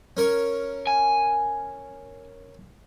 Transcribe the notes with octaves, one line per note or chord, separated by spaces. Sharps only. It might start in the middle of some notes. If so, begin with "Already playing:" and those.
C#4 A#4 C#5
G#5